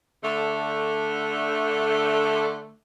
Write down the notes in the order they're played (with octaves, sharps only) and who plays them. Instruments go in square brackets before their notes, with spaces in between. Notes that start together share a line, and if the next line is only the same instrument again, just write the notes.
[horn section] D3 A3